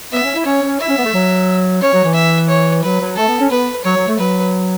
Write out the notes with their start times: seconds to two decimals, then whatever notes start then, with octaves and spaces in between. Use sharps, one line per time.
0.12 B3 E5
0.23 C#4
0.34 E4
0.45 C#4 C#5
0.63 C#4
0.80 E4 E5
0.88 C#4
0.97 B3
1.05 A3
1.13 F#3
1.81 C#4 C#5
1.93 F#3
2.04 E3
2.15 E5
2.49 C#5
2.83 F#3 B4
3.00 F#3
3.16 A3 A4
3.27 B3
3.39 C#4
3.50 B3 B4
3.84 F#3 C#5
3.96 F#3
4.07 A3
4.18 F#3 B4